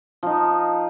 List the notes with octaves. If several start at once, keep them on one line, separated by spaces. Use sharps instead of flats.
F3 D#4